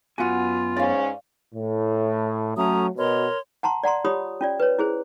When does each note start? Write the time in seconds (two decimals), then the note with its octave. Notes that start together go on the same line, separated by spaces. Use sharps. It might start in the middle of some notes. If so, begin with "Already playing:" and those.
0.18 F#2 B3 F4 F#4 F#5 G#5
0.76 G#2 C#4 D5 F5
1.55 A2
2.57 F#3 A3 C#4 A#5 D#6
2.96 B2 A#4 C#5 C6
3.63 F#5 A5 A#5 C6
3.83 D5 F#5 A#5 C6
4.05 F4 G4 C#5 B5 D#6
4.41 C#4 F4 D5
4.60 B4 C#5
4.79 E4 G#4 C5